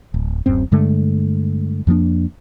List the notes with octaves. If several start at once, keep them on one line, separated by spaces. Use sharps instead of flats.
D1
D1 F#2 C4
G2 D3 G#3 A3
F2 F3 A#3 D4